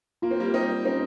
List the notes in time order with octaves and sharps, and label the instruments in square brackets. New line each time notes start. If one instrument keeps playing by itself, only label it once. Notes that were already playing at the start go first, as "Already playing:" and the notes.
[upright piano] A#3 [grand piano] F4
[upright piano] C4
G3 A#3
[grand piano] G3 [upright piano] C4 D#4
[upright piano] C4 D#4 [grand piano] C#4